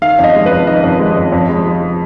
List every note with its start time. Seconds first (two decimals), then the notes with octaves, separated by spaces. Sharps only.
0.02 D#3 F5
0.19 F2 D#5
0.35 G#3
0.46 B4
0.52 F2
0.67 D#3 D#5
0.84 F2
1.00 G#3
1.17 F2
1.32 F2
1.49 G#3
1.66 F3